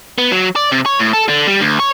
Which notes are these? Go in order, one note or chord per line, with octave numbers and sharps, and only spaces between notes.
B3
F#3
D5
C3
C#5
A2
A4
D3
G3
D2
C#5